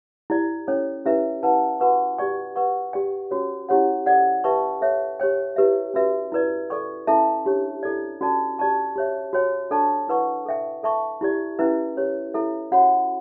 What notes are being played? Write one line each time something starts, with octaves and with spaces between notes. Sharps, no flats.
E4 G4 D5
C#4 E4 A4 C#5
C#4 E4 G4 B4 E5
E4 B4 F#5 A5
F#4 B4 F#5 C#6
G4 D5 G5 C#6
B4 F#5 C#6
G4 D5 G5
C#4 F#4 C#5
C#4 E4 G4 C#5 F#5
A4 D5 F#5
G4 B4 E5 A5 C#6
A4 C#5 E5
G4 C#5 G5
E4 G4 B4 E5
C#4 F#4 B4 E5
E4 B4 D5
A4 D5 G5 C#6
C#4 E4 A4 E5 A5
D4 G4 C#5
E4 A4 D5
C#4 F#4 A4 D5 A5
G4 D5 A5 C#6
G4 C#5 E5
F#4 C#5 G5
D4 A4 D5 A5 C#6
E4 B4 F#5 C#6
A4 E5 G5
A4 E5 A5 C#6
E4 G4 D5
C#4 E4 B4 E5
C#4 G4 C#5
E4 A4 E5
C#4 F#4 C#5 F#5 B5